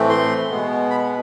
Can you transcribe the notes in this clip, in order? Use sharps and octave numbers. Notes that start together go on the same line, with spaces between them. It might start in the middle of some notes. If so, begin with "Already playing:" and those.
Already playing: A2 E3 A3 C4
C6
B2 G#3 B3
B5